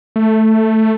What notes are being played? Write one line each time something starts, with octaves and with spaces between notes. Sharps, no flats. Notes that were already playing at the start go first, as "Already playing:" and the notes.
A3